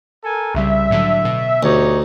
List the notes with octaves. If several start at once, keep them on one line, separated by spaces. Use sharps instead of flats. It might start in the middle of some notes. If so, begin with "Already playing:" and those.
A4 A#4 G#5
C2 C#3 G3 E5
A2 D3 F#3
B2
D2 D#4 G4 C#5